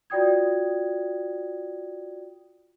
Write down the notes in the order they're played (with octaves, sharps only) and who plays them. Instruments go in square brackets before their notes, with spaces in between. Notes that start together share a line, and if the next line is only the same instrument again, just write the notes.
[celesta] F4 F#4 D5 G5 D#6 G#6